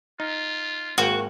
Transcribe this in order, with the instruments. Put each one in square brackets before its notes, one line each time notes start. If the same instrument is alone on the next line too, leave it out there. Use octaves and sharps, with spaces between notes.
[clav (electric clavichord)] D#4 [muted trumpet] F4
[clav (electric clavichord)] G#1 A#3 G5 [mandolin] F#4